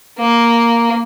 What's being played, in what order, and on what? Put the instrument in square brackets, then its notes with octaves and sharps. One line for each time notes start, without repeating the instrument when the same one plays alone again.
[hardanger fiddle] A#3